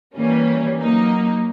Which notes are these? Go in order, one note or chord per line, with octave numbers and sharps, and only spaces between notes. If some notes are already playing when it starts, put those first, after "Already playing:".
E3 G3 A#3 C#4
F#3 A#3 D#4